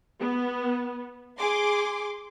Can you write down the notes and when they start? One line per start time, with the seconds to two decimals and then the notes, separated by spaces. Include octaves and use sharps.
0.21 B3
1.38 G#4 C6 D6